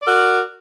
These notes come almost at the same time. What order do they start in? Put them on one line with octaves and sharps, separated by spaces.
D5 A#4 F#4